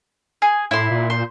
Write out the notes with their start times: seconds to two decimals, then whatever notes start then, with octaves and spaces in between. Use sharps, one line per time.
0.42 G#4
0.71 A2 E4 C6
0.91 A#2
1.10 C5